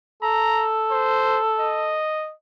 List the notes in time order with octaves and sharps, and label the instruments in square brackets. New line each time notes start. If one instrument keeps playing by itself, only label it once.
[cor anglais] A4 [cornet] A#5
[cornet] C5
D#5